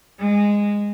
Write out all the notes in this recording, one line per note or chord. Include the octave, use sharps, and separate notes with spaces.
G#3